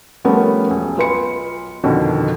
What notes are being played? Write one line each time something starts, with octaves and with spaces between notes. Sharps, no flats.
F3 G3 A3 B3 C#4 A#4
E1
B1 F4 B4 B5 C6 C#7
F2 B2 D3 D#3